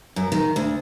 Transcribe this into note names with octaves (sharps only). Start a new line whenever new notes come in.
F#2
D#3
D2